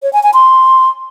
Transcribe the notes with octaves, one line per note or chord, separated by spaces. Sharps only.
C#5
G#5
G#5
C6